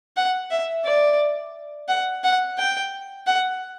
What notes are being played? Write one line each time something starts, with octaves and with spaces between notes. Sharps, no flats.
F#5
E5
D5
F#5
F#5
G5
F#5